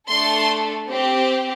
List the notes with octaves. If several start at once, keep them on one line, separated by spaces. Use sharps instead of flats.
A3 D4 A4 C6
C4 G4